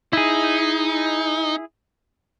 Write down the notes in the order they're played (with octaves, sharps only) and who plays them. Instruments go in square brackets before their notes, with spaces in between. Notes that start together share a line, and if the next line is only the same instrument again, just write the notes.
[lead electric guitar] D#4 [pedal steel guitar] E4 G#4